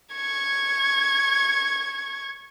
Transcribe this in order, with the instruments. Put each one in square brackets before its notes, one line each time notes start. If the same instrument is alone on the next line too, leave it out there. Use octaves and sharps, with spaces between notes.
[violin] C#6 G#6